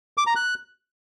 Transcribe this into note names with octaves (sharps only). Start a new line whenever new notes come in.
D6
A#5
F#6